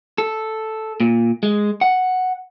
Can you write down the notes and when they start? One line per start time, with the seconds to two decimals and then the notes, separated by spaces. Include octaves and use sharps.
0.18 A4
1.00 A#2
1.43 G#3
1.81 F#5